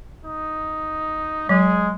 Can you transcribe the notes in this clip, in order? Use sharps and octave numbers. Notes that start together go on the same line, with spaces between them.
D#4
F#3 G#3 G#4